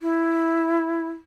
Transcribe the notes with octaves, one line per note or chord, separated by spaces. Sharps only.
E4